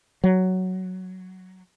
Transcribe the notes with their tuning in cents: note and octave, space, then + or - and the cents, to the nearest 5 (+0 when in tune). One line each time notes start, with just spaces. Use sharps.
F#3 +5